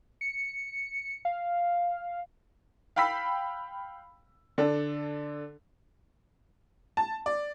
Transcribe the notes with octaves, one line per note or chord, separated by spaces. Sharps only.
C#7
F5
F5 G5 B5 E6 B6
D3 D4 A4
A5
D5